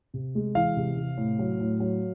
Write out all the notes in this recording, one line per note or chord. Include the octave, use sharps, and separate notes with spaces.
C3
G#3
E3 F5
C3
C3
A2
F#3
A2
F#3